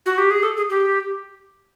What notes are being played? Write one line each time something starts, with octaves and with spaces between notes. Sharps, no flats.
F#4
G4
G#4
A4
G#4
G4